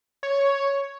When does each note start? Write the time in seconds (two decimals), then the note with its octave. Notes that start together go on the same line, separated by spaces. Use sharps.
0.23 C#5